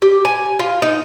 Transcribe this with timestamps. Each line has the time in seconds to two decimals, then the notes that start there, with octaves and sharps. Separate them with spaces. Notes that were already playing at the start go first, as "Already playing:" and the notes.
0.02 G4
0.25 G#5
0.59 F4
0.82 D#4